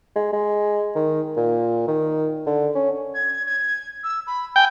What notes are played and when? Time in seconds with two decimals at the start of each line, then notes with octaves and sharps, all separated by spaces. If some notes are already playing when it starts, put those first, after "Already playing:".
0.16 G#3
0.33 G#3
0.96 D#3
1.37 A#2
1.88 D#3
2.46 D3
2.75 C#4
3.14 G#6
3.46 G#6
4.03 E6
4.27 B5
4.56 G5 G#5